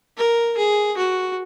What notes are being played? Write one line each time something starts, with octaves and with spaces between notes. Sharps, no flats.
A#4
G#4
F#4